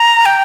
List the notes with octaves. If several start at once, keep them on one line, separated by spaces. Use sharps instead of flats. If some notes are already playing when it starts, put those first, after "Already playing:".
Already playing: A#5
G5